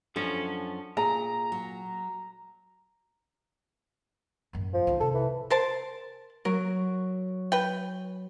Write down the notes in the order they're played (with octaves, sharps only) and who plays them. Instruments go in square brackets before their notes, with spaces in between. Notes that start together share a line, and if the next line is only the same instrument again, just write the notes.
[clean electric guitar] F#2 F3 C#4 [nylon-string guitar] D4 A4
[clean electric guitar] A#2 [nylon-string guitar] G#4 [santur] A#5
[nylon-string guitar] F#3
[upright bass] A1 F#2
[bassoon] F3
[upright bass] C#2 D#4
[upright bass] C3 [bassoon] A4
[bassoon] E3
[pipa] A#4 C5 A5
[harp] F#3 [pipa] A#4
[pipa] B4 G5